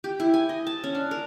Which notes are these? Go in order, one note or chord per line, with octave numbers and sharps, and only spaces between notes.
G4
E4
G#5
D#5
A5
C#4
D4
A#4